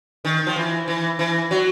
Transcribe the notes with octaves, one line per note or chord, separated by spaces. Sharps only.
D#3
F3
E3
E3
E3
F#3